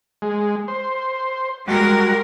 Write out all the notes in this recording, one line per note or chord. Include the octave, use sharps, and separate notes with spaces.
G#3
C5
G3 G#3 F#4 A#4